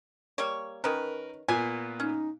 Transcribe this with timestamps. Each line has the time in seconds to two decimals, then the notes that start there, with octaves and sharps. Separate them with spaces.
0.38 G3 A#3 C#5
0.84 D#3 C#4 A#4 B4
1.48 A#2 A#3 B3 G#5
2.00 C#4 D#4